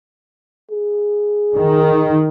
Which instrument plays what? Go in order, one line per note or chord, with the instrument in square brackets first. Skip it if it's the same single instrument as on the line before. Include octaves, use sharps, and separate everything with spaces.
[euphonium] G#4
[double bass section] D#3